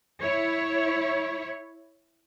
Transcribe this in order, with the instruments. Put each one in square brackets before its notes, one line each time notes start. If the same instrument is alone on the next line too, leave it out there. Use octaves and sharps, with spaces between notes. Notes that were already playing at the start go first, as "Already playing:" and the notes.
[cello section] E4 C#5